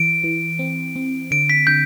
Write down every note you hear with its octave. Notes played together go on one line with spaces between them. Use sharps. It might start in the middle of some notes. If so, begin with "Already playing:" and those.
Already playing: E3 D7
E3
C4
C4
D3 D7
B6
D3 G6